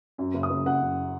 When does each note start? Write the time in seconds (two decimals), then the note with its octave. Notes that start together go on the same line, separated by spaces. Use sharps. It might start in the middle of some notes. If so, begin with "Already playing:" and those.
0.18 F#2
0.34 F#1
0.43 D#6
0.50 F#1
0.66 F#1 F#5
0.82 F#1